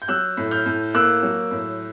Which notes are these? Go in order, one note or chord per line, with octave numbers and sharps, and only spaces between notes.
G6
F#3 E6 F#6
A2
F6 G6
A2
A#3 E6 F#6
F#3
A2